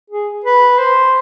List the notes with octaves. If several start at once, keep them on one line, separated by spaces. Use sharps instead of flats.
G#4
B4
C5